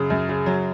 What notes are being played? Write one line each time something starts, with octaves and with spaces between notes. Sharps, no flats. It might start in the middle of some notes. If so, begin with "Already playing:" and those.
Already playing: F#2 C#3
F#2
C#3
F#3